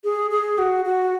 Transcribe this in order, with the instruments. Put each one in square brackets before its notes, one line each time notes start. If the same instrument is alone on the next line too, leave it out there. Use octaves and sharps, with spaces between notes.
[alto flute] G#4
G#4
F#4
F#4